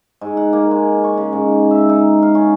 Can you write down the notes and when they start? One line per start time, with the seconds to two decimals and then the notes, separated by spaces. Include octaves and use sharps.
0.21 G#2
0.37 F#5
0.53 A#3
0.71 G#3
1.04 C#6
1.18 C#3
1.33 G#2
1.71 E5
1.89 D#4
2.22 F5
2.35 C#4